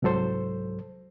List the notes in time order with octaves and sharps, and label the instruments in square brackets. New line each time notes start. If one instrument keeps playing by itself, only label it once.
[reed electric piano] C2 G#2 F#3 A4 C5